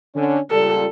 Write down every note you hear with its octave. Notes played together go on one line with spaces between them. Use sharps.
D3 C#4
C#2 A#2 G3 A4